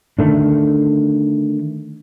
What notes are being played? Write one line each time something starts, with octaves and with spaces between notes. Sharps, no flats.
D3 D#3 A3 D4